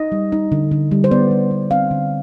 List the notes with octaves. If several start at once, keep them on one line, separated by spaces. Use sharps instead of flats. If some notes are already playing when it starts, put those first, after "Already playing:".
Already playing: D#4 D#5
G3
D#4
D3
D3
G3
C5
B3 D5
G3
B3
C4 F5
D3